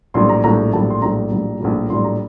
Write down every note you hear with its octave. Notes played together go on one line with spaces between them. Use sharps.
A#1 A2 G3 C6
A#5
A#1 A2 G3 A#5
A#1 A2 G3 A5
C6
A#1 A2 G3 A#5
A#1 A2 G3
A#1 A2 G3
A#1 A2 G3 C6
A#5